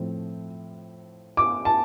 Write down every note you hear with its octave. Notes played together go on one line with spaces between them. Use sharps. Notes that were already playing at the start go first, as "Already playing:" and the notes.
Already playing: A2 F3 C4
D6
A5